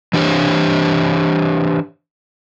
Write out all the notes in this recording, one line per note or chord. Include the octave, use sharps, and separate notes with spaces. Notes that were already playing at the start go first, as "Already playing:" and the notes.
E3 D4 G4 C5 C#5